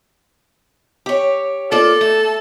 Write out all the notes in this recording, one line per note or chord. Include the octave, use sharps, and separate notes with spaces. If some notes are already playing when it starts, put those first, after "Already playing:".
G4 C#5
A#3 F4 A4 D5
A3